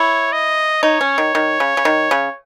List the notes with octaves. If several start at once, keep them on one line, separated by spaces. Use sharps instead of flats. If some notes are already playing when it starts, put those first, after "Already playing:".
Already playing: E4 C#5
D#5
D#4 C#5
C#4
D#3
D#3
C#3
C#3
D#3
C#3